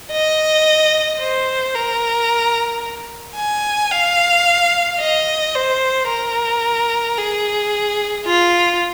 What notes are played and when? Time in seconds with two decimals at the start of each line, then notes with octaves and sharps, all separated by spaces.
0.11 D#5
1.20 C5
1.74 A#4
3.36 G#5
3.91 F5
5.00 D#5
5.54 C5
6.08 A#4
7.18 G#4
8.25 F4